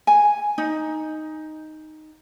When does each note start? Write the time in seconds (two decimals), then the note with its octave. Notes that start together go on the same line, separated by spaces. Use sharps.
0.07 G#5
0.58 D#4